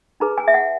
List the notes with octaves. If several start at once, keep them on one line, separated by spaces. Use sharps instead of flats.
D#4 G#4 B4 A#5
G#5
E5
F#5